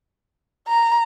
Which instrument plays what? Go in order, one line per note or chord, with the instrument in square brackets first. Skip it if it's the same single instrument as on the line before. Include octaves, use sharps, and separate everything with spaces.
[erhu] A#5